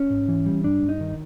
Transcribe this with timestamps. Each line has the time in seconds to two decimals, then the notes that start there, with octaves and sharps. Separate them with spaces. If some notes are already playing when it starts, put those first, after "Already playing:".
Already playing: C#4
0.10 G#2
0.28 E3
0.46 G3
0.64 G2 D4
0.83 G2
0.89 D#4
1.00 D#3